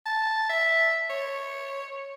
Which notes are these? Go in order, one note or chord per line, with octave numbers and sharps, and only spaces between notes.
A5
E5
C#5